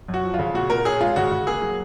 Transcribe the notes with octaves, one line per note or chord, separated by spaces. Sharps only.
F#2
F#4
F3
F4
C#3
A#2 F#4
A#2 A#4
C#4 G#4
G#3 F4
C#3 F#4
C#3
A#3 G#4
F#3